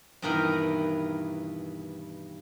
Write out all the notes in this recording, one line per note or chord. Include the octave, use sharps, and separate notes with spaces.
G2 B2 D#3 E3 A#4 G5